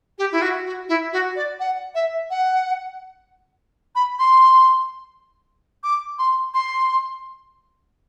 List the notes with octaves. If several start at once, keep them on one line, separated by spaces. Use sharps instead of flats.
G4
E4
F#4
F#4
E4
F#4
D5
F#5
E5
F#5
B5
C6
D6
C6
C6